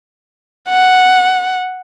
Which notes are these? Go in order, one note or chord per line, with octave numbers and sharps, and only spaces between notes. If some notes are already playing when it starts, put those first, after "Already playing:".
F#5